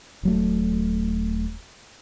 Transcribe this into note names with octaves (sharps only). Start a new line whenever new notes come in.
D#1 F#3 A3